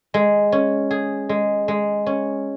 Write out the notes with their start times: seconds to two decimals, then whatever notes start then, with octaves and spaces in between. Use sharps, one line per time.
0.14 G#3
0.52 C#4
0.91 G#4
1.29 G#3
1.68 G#3
2.06 C#4